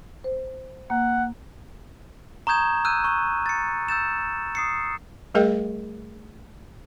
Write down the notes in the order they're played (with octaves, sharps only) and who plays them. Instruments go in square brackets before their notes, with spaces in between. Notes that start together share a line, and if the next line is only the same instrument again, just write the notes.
[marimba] C5
[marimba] A#3 [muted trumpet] F#5
[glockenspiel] A#5 C#6 D#6 G6 G#6 E7
E6 F#6 G6 D#7
C#6 F#6 G6
A6 C#7
E6 G6 A6 E7
D#6 C7 C#7
[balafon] G3 A3 G#4 A#4 D#5 G5